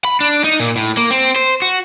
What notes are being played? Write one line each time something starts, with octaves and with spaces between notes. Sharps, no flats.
B5
D4
D#4
A#2
A2
A#3
C4
C5
F#4